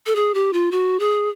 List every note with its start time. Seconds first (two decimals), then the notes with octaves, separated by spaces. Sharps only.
0.07 A4
0.16 G#4
0.34 G4
0.53 F4
0.71 F#4
1.00 G#4